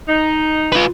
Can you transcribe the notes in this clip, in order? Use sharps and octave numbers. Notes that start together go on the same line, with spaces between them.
D#4
F4 B4